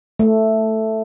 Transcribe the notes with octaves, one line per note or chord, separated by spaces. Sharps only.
A3